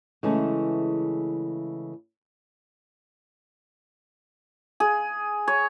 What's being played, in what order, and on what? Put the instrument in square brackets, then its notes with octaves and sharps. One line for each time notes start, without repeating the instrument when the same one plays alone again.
[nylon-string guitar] C#3 E3 G#3 A3
[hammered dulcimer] G#4
C#5